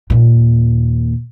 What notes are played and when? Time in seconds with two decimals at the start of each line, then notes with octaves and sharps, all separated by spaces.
0.10 D#2 A#2